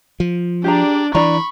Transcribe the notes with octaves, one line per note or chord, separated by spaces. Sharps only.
F3
D4 G4 G#4 D5 A#5
E3 D4 D5 A#5 B5 C#6